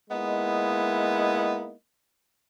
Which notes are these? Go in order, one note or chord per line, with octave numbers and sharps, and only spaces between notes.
G#3 A#3 B3 D#4 E4 D#5